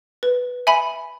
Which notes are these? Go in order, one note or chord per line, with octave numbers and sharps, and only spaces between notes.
B4
E5 G#5 B5